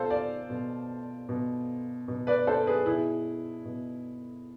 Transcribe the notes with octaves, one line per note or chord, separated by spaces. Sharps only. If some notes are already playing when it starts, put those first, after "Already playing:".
Already playing: B2 F4 A4 C5
D5 F5
B2
B2
B2
B4 D5
A4 C5
G#4 B4
B2 E4 G#4
B2